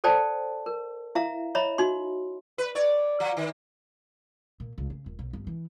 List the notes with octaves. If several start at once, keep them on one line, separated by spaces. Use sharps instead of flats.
A4 C5 D5 G5 A5
A#4
E4 E5 F5 A#5
C#5 D#5 E5 A#5 B5
D#4 F#4 C6
B4
C#5 D5
F3
D#3
A#2
C#2
C#3
D#1
B1
G1
E3